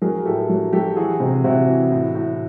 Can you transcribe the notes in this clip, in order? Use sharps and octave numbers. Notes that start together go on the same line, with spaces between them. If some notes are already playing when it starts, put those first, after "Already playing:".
F#3 G#4 A#4
A2 G4 A4
F#3
F#3 G4 A4
E3 F#4 G#4
C3
C3 E4 F#4
E3
A2
A2